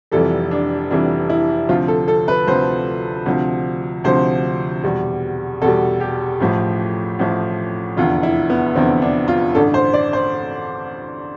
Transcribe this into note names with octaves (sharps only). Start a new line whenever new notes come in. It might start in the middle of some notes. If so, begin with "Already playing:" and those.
F1 F2 E3 G3 A4
D4
F1 F2 E3 G3 D4
E4
D2 C3 F3 F4
A4
A4
B4
D2 C3 F3 C5
D2 C3 F3
D2 C3 F3 C5
E2 B2 G3
E2 B2 G3 A4
G4
A1 A2 F3
A1 A2 F3
F1 E2 D3 F4
E4
B3
F1 E2 D3 C4
D4
F4
A1 G2 D3 A4
C5
D5
C5